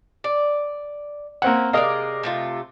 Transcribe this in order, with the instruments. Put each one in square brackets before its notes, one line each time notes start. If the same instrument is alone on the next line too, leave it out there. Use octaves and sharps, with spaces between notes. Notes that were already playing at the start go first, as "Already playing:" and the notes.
[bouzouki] D5
[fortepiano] A#3 C4 F#5 [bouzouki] C#4
[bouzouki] C3 G#3 D5 [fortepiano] A#4 D#5 F5
[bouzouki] C3 A3 F4